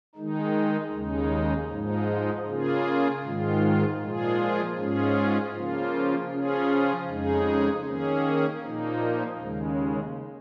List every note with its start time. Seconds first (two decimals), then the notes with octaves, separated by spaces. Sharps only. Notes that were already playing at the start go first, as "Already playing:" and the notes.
0.15 D#3 G#3 D#4
0.92 D#2 C#3 G#3 D#4
1.69 G#2 F3 G#3 D#4
2.46 C#3 A#3 F4 G#4
3.23 G#2 D#3 G#3 F4
4.00 A#2 F3 G#3 F4 G#4
4.77 G#2 G#3 C#4 F4 G#4
5.53 C#3 F3 A#3 F4
6.31 C#3 F3 C#4 F4 G#4
7.07 F2 C#3 G#3 D#4 G#4
7.84 D#3 A#3 C#4 G#4
8.62 A#2 F3 A#3 D#4
9.38 D#2 C#3 G#3